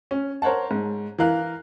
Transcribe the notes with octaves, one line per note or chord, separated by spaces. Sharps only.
C#4
A#4 C5 C#5 F#5 A5
G#2
E3 A#4 F5 F#6